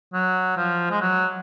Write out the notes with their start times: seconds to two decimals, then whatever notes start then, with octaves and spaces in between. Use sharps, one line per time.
0.13 F#3
0.57 F3
0.90 G#3
1.01 F#3